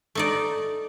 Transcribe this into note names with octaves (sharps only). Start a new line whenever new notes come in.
A3 D#4 D5